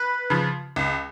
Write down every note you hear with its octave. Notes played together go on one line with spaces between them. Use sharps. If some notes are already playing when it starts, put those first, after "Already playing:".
Already playing: B4
C#3 F3
C#2